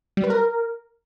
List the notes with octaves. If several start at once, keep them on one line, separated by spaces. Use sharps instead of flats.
G3
B4
A#4